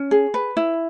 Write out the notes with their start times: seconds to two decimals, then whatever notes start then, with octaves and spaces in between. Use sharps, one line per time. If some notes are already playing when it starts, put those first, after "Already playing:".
Already playing: C#4
0.11 G#4
0.34 B4
0.57 E4